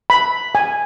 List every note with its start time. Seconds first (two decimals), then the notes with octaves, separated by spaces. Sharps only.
0.10 B5
0.55 G#5